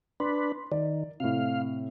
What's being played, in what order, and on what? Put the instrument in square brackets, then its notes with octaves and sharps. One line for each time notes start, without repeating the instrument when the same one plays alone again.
[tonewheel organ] D4 B4 [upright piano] C6
[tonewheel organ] D#3 [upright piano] D5
[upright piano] A2 C3 [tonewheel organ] F5